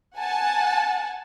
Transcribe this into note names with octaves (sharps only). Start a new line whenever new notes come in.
F#5 G#5 A5